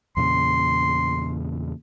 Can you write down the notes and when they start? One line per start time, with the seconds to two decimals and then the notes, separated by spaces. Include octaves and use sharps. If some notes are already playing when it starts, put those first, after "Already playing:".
0.17 E2 A#2 C#3 C6